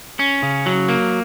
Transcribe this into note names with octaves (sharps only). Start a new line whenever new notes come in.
C#4
C#3
F#3
A#3